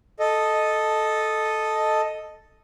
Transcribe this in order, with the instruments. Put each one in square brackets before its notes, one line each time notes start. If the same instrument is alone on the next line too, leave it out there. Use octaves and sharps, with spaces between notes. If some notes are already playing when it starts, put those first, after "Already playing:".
[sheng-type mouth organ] A4 D#5